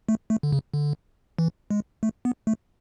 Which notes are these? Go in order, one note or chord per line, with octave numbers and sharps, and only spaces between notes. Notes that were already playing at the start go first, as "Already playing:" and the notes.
A3
A3
D3
C#3
D3
E3
G#3
A3
B3
A3